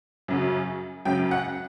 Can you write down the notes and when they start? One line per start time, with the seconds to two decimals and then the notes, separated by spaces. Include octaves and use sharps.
0.28 F#2 C#3 F#3
1.05 F#2 C#3 F#3 G5
1.31 F#5